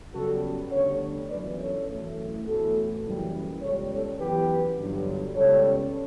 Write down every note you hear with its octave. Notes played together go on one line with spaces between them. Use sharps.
F#2 C#3 G3 B3 F#4 A4
D2 D3 G3 B3 A4 C#5
G1 F#2 E3 B3 B4 D5
A4 C#5
F#2 E3 A3
A1 A2 E3 B3 F#4 A4
F#1 F#2 E3 G3
C#2 C#3 G3 B3 A4 C#5
A4 C#5
F#2 E3 B3 G4 B4
G1 G2 D3 F#3
C#2 C#3 G3 B3 A4 C#5